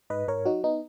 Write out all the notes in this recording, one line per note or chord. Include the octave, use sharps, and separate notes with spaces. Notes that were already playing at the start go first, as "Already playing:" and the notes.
G#2 B4 D#5
G#2 A#4 C#5
F#3 D#4 F#4
B3 D#4